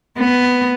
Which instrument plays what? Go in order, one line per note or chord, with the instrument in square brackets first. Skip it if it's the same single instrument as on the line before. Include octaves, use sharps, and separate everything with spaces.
[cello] B3